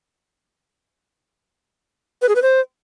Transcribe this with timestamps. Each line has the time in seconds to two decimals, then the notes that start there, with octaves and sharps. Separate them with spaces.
2.22 B4
2.29 G#4
2.35 B4
2.42 C5